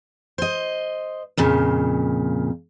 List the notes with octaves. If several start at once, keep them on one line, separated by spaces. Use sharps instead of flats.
C5 D#5
F2 A#2 C#3